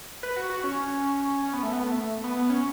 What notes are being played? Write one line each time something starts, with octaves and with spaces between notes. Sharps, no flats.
B4
F#4
F#4
C#4
C#4
B3
A3
B3
A3
B3
B3
C#4